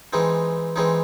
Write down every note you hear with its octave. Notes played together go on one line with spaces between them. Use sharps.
E3 G#3 C4 D#4
E3 G#3 C4 D#4